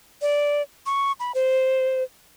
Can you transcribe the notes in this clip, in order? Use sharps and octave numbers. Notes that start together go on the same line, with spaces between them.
D5
C#6
B5
C5